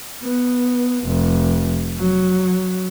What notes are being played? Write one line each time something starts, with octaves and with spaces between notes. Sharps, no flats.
B3
F1
F#3